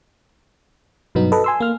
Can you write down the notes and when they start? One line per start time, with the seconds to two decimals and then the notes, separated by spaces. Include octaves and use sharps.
1.15 G2 B2 F#3 B3 D#4
1.32 A4 B4 D#5
1.44 G#5 C6 E6
1.60 A#3 F6